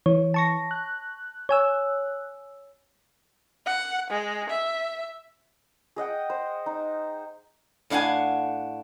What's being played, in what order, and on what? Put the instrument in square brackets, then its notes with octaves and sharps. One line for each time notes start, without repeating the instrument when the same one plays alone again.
[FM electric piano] E3 [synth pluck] C#5
[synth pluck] A5 C#6 A#6
[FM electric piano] F#6
[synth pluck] C#5 G#5 E6
[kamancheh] F#5
G#3
E5
[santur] G#4 D#5 F#5 G5
C5
D#4
[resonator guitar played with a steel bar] A2 D4 F5 F#5 G#5